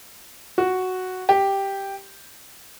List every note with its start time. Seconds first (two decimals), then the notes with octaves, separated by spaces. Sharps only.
0.58 F#4
1.29 G4